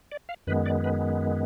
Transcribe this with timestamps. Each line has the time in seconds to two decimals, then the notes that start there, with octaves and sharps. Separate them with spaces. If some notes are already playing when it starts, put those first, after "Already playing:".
0.12 D5
0.29 F5
0.47 F#2 D#3 G#3 B3 B4
0.66 D5
0.84 B4